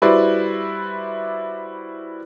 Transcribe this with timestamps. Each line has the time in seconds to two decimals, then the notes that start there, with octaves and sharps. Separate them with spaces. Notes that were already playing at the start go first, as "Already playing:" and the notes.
0.02 G3 E4 F#4 B4 C5 D5